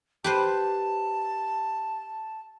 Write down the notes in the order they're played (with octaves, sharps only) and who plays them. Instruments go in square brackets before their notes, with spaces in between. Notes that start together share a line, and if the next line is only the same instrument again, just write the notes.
[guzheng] G4 B4 C5 [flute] A5